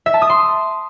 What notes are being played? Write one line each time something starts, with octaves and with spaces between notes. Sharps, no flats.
E5
A5
D#6
C6